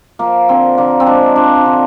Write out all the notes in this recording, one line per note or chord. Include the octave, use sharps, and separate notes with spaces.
F3 A#3
D3 C4
D3 A#3
C4
G#3 D4
F3 D4
D3